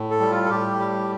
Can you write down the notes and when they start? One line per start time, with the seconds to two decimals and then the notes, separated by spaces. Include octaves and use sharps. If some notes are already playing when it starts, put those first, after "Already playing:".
Already playing: A2
0.11 A4
0.20 G3
0.31 F4
0.45 A4
0.50 A2 G4
0.79 G3